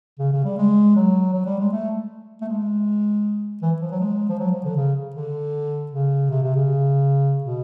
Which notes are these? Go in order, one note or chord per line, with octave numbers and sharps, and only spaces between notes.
C#3
C#3
G3
G#3
F#3
F#3
G3
G#3
A3
A3
G#3
E3
F3
F#3
G#3
F3
F#3
F3
D3
C#3
D3
C#3
C3
C3
C#3
B2